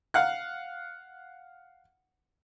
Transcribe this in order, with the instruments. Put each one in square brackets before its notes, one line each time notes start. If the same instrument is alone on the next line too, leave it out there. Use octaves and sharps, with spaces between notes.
[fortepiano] F5 F#5 F#6